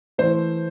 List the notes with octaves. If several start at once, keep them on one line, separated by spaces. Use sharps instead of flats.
E3 A3 C5